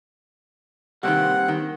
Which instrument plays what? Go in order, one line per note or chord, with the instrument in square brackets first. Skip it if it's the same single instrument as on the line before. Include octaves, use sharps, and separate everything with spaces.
[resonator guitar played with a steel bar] C3 D#3 [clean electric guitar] G3 A#3 C4 [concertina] F#5
[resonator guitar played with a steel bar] D#3